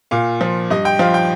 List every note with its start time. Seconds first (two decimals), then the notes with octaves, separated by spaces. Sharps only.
0.11 A#2 F5
0.41 F3
0.71 G2 D#5
0.85 G5
0.99 F3 F5
1.14 G5